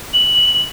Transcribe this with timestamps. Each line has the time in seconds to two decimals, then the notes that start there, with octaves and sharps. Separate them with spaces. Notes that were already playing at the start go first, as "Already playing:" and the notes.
0.14 F#7